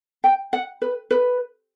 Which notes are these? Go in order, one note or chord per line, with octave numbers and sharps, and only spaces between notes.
G5
F#5
B4
B4